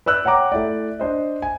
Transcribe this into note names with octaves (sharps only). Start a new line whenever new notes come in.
B4 D5 E6 F#6 G6
C#5 F#5 G5 A#5 D6
A3 E4 D5
D4 C5 D#5
G#5